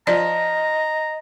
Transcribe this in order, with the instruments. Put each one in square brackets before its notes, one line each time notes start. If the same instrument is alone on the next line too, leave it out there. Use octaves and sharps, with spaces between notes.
[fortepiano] F3 [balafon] D5 [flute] D#5 [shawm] A#5